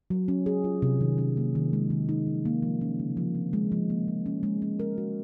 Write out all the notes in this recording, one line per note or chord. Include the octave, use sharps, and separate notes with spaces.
F#3
C#4
G#4
F4
C3
D#3
C#4
A#3
D#3
G#3
D#3
D#4
F3
A#3
F3
C#4
C#3
F3
C4
G#3
F3
A#3
F3
C#4
G#3
C#4
A#4
F#4